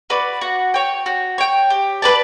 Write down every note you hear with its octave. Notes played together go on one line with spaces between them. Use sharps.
F#4 B4 D5
F#4
C#5 G5
F#4
C#5 G5
G4
B4 D5 A5